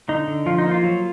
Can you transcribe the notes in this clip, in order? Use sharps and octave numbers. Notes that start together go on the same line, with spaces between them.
D3 D#4
D3
F3 F4
D#4
A#3
F4
F#3